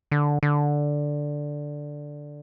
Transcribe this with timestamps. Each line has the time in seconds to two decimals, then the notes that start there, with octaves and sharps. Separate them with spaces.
0.12 D3
0.43 D3